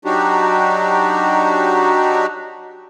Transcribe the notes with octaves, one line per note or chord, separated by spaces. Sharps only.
F#3 D4 D#4 F#4 G4